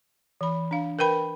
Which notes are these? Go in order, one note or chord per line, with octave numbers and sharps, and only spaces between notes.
E3 B5
D4 F5
A#4 B4 G5 B5